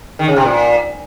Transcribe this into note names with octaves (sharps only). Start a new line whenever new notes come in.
D#3
C#3
C3
A#2